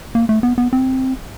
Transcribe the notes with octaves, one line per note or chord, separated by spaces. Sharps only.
A#3
A3
B3
B3
C4